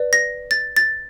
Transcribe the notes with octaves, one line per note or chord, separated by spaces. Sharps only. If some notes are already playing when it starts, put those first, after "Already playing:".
Already playing: B4 D5
A#6
A6
A6